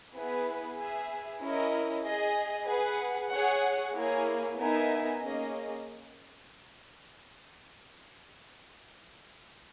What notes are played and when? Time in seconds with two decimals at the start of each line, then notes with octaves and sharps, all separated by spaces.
0.14 B3 E4 G#4 B4
0.77 G#4 B4 E5 G#5
1.41 C#4 E4 A#4 D#5
2.04 G#4 D#5 G#5
2.67 G#4 B4 F#5
3.30 G#4 C#5 F#5
3.94 A#3 E4 G#4 C#5 G#5
4.56 B3 D#4 A#4 E5 G#5
5.21 A#3 C#4 G#4 D#5